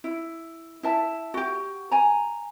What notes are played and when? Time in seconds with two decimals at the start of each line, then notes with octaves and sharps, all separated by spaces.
0.04 E4
0.83 E4 E5 A5
1.34 F#4 G4
1.91 G#5 A#5